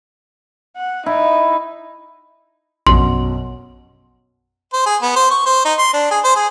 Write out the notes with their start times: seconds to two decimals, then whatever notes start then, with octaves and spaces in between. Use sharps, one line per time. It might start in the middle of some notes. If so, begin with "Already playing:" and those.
0.77 F#5
1.06 D#4 E4
2.87 A#1 F#2 B2 C6
4.73 C5
4.86 G#4
5.02 B3
5.16 C5
5.31 C#6
5.46 C5
5.65 D#4
5.79 C6
5.94 D4
6.11 G#4
6.24 C5
6.36 G#4